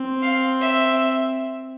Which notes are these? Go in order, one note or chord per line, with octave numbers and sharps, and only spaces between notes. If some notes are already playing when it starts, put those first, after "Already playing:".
Already playing: C4
F5
E5